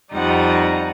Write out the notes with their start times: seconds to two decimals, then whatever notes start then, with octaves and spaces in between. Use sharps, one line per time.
0.11 F2 G3 D#4 F#5